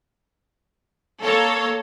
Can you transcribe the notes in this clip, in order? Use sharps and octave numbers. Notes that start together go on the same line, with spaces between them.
A#3 A4 C#5